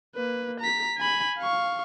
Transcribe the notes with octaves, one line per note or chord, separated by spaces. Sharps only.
A#3 B4
A#5 B6
G#5 B5
F5 C#6